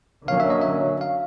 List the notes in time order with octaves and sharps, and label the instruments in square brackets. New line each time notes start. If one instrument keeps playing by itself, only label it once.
[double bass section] D3 F#3 A#3 C#4 [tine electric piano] F5
[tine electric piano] E5
D#5
E5
F5